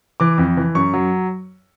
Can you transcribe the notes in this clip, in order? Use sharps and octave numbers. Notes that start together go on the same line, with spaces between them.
E3 D6
F2
E3
F#2 C#6
F#3